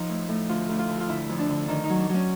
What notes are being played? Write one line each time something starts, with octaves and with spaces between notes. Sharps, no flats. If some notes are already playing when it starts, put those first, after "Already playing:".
Already playing: F3 D#4
A2
A2
D2 F4
D2
F4
D3
F4
D3 E4
F2
D4
D3
D#3 D4
D#4
F#3
D4
F#3
C#4